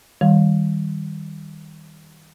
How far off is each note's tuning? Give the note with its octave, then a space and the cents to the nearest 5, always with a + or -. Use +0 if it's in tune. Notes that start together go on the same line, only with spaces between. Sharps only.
D#3 +15 G3 +0